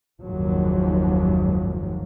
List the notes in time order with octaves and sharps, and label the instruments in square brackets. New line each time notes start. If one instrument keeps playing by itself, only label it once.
[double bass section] F#1 D#2 G#2 F3 F#3